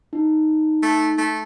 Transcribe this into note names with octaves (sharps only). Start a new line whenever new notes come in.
D#4
A3
A3